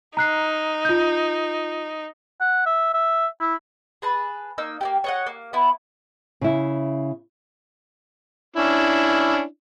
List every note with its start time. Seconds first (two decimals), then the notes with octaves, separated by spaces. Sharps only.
0.17 D#4 A#5 F#6 C7
0.85 F4 G6
2.41 F#5
2.66 E5
2.94 E5
3.41 E4
4.02 G#4 B4 A5
4.58 A#3 D#4 E6
4.81 A#3 E4 G4
5.04 C#5 D#5 F#5
5.26 A#3
5.53 B3 E4
6.41 C#3 E4
8.56 C#4 D4 E4